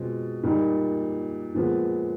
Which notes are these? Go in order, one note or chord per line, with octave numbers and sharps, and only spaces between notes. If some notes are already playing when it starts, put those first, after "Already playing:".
Already playing: B2 G#3 C4 F4
A#2 G3 A#3 D#4
A#2 F3 G#3 B3